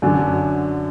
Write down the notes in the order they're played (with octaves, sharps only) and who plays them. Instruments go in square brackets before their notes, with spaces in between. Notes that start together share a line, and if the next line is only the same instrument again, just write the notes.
[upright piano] F#2 D3 F#3 D4 F#4